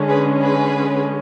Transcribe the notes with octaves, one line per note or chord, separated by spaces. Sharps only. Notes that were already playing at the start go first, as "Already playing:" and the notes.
Already playing: D3 G#3 C#4
G#4 B4
G#4 B4